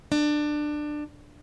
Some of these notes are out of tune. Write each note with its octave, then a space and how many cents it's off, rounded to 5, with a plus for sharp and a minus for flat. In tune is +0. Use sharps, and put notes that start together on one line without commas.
D4 +20